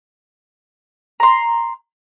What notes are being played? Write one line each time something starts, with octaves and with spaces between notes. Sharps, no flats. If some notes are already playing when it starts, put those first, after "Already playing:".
A#5 C6